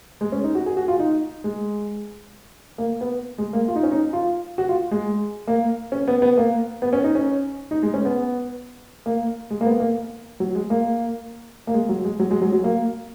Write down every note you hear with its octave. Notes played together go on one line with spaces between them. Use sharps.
G#3
C#4
D#4
F#4
G#4
F#4
F4
D#4
G#3
A#3
B3
G#3
A#3
F4
D#4
C#4
D#4
F4
F#4
F4
G#3
A#3
C#4
B3
B3
A#3
B3
C#4
D#4
C#4
D#4
G#3
C#4
B3
A#3
G#3
A#3
B3
A#3
F#3
G#3
A#3
A#3
G#3
F#3
G#3
F#3
G#3
F#3
F#3
A#3